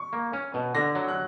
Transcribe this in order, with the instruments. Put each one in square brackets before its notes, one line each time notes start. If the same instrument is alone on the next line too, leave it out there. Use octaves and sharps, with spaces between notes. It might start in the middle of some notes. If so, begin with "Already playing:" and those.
Already playing: [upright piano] C#6
[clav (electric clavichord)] A#3
C#4
B2
[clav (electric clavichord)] D3 [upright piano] A#6
[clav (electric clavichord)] F#3
[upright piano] F#6